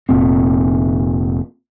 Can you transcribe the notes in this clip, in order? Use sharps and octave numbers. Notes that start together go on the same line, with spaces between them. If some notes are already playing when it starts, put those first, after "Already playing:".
F1 A#2 C4